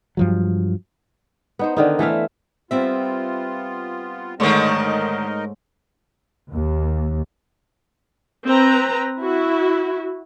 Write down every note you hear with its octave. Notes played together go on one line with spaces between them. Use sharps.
G2 F3 F#3
B3 D#4 C5
D3 D#3 D#4
E3 A3 E5 F5
G3 B3 C4 F4 E5
G#2 D3 D#3 A3 D#4 A#4 C#5 D#5
D#2
C4 B4 A#5
E4 F#4